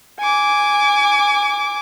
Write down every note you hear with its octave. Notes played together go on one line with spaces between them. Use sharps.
G#5 D6